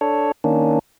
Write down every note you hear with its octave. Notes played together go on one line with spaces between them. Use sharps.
D4 A4 C#5
D#3 A#3 C#4 D4